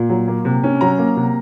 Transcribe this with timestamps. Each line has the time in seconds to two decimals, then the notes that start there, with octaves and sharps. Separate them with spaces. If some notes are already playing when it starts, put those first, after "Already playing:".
Already playing: A#2
0.10 F#3
0.28 A#3
0.45 C3
0.64 C#4
0.81 F#3 A#5
0.98 A#3
1.17 C3